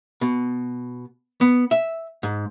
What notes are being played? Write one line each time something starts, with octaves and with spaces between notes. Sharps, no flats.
B2
B3
E5
G#2